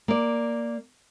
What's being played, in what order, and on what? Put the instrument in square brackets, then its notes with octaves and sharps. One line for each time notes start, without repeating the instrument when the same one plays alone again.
[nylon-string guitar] A#3 D5